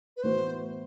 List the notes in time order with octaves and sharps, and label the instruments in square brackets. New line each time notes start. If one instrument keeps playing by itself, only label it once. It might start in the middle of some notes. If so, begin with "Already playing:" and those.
[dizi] B4
[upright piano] A2 E3 B3 F#4 [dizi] C5